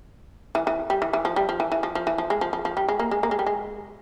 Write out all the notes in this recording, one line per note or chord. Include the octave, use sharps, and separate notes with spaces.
E3
E3
G3
E3
E3
F3
G3
F3
E3
E3
F3
F3
E3
F3
G#3
F3
F3
F3
G3
G#3
A#3
G#3
A#3
G#3
G3
G#3